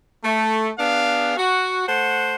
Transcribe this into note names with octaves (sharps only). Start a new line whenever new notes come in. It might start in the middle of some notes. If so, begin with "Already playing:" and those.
A3
B3 D4 G#4 F5
F#4
A3 C5 F#5